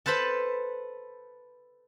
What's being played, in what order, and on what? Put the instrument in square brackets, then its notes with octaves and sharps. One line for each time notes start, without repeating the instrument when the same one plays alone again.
[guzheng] A4 B4 C5 A5 B5